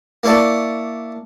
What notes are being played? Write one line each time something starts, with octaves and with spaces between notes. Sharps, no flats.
A#3 E4 C#5 D5 A5